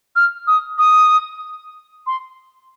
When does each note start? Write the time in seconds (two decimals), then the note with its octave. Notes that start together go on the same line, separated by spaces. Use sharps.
0.16 F6
0.47 D#6
0.78 D#6
2.07 C6